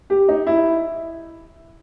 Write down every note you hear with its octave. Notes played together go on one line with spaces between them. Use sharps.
G4
D#4
E4